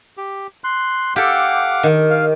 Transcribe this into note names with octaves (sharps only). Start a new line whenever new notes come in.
G4
C6 F#6
G4 A4 F5 F#5 D6
D#3
F5